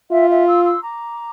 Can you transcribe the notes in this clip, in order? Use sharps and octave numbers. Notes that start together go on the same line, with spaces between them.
F4 E5 G5
E5 G5
C6 E6
C6 E6
A#5 D6